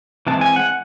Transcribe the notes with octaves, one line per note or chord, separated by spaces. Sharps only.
E3 G#3 C4 A5
G#5
F#5